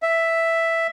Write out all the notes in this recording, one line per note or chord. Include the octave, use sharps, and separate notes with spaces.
E5